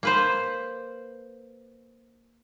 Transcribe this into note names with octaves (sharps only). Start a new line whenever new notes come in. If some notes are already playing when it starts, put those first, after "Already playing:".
A#3 B4 C5